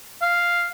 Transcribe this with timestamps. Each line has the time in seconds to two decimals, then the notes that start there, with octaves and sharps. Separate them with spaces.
0.22 F5